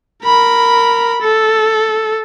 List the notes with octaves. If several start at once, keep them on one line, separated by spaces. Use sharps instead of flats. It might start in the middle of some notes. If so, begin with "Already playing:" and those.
A#4 B5
A4